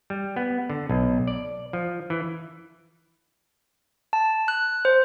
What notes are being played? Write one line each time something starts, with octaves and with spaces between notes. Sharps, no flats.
G3
B3
D3
B1
D5
F3
E3
A5
F#6
C5